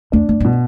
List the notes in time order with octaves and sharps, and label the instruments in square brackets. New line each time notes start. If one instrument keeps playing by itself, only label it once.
[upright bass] E2 [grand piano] D4
[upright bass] F2
G2
[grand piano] B2